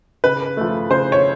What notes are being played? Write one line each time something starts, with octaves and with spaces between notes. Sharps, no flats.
C#3 B4
F3 A3
C#3 C5
C#5